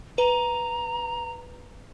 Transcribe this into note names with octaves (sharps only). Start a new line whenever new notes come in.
B4 A#5